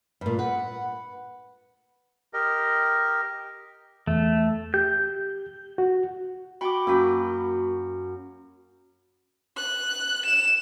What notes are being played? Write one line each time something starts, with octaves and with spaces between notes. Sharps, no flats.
G2 A#2
B4 F#5
G4 A#4 D#5
E2 A3
G4 G6
F#4
F#4 G5 B5 D6
F#2 A#3 F#4 B5
F#6
E7